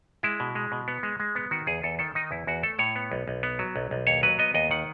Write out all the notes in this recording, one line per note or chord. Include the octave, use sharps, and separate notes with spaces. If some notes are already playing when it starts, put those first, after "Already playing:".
G#3 E4
B2
G#3
B2
B3
G#3
G#3
B3
D#3 F#4
E2 G#4
E2 A4
D#3 A4
D#3 D#4
E2 E4
E2 F#4
A3 A4
A2 C#5
B3
B1
B1
B3
F#3
B1
B1
D#2 C#5
F#3 B4
B3 D#5
D#2 D#5
D#3 F#5